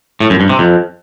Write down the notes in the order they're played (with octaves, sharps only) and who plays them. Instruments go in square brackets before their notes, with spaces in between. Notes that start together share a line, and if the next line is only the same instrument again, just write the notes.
[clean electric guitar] A2
F#2
G2
C3
F2